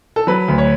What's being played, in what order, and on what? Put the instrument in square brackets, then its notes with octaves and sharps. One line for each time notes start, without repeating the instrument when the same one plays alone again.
[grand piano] A4
F#3 B4
D2
C#5